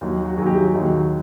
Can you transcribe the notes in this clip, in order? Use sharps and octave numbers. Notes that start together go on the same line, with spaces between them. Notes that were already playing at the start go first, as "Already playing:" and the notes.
D#2 D#3 F#3
F#4
D#2 D#3 F#3 G#4
G4
G#4
G4
D#2 D#3 F#3 F#4